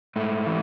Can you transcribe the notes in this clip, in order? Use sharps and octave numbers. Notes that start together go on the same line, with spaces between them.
G#2 A3
E3